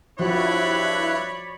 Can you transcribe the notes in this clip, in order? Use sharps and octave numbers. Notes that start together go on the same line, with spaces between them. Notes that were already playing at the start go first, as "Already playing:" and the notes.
G2 F3 E4 F#4 C#5 D5 B5 F#6